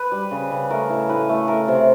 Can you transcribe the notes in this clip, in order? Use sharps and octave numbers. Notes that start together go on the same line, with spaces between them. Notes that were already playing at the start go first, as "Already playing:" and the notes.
Already playing: B4
G3
C#3
C#3
A3 A#4
A2
A2 B4
A3
A3 A#4
C3